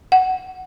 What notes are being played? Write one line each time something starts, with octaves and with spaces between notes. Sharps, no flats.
F#5